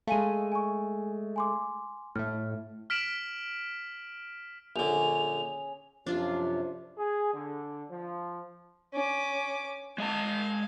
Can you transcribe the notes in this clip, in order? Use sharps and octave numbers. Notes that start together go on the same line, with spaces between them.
G#3 A3 F5 G#5 D#7
G#5 C#6
G#5 C6 D6
A2 A3 F6
F6 B6 D7 E7 F#7
A#1 D3 C#4 G#4 F7
F#2 C3 F3 D4 F4
G#4
D3
F3
C#4 D6
G#3 D#5 F5 A5